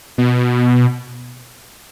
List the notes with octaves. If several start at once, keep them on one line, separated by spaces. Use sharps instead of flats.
B2